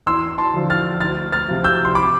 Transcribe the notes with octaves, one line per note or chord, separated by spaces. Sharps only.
E2 C6 E6
A5 C6
D3 F3
F6 A6
D2 F6 A6
F6 A6
C3 F3
E6 G6
C6
B5 D6